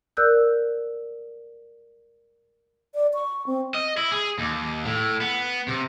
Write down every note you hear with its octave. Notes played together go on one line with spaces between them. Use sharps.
A#4 D5 E6 F#6 G6
D5
C#6
C4
D#5
E4
G#4
D#2
A2
B3
C3